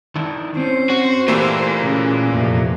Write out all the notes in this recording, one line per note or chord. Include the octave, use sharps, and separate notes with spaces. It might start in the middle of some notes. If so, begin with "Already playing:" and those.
D#3 D4 E4
C4 C#4 C5
F#4
A#2 E3 A3 A#3 G4 B4 E5 G#5
C#3
F2 C3